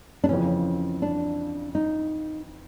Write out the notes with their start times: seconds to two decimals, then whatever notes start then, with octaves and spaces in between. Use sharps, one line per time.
0.24 D4
0.29 F2 C#3 E3 C#4
1.02 D4
1.75 D#4